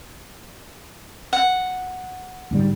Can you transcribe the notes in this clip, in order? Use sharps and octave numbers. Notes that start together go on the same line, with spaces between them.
F#5
D2 G#2 G3